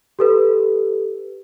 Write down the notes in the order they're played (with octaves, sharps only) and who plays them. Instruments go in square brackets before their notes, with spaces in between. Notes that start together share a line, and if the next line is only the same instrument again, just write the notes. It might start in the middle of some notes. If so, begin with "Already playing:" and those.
[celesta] G4 A4 B4